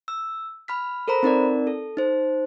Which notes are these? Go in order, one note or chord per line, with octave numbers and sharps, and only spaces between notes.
E6
B5 F6 B6
A4 A#4 C5 A#5 B5
C4 D#4 A#4 D5
A4
D#4 C5